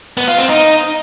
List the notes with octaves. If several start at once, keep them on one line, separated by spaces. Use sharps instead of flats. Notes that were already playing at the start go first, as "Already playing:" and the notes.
B3
F4
C4
D#4